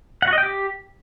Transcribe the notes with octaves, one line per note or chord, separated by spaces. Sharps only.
F#5
F#4
D#5
G5
G4